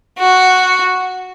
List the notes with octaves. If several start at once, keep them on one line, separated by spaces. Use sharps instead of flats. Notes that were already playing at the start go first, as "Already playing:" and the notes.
F#4